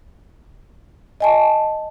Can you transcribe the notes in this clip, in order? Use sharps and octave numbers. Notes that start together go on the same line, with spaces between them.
D#5 G#5 A5